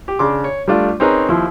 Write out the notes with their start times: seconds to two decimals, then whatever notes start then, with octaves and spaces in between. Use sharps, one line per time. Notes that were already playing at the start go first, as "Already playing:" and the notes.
0.08 G4
0.19 C#3 D4 C6 D6
0.44 C#5
0.67 G3 A3 D4 F4
1.00 C4 C#4 D#4 G#4 A#4 B4
1.29 D#2 F3 E4 C6